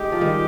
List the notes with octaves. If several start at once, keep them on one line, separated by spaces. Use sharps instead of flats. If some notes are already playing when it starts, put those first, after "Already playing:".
Already playing: G#3 D#4 G4
F3
D#3 G3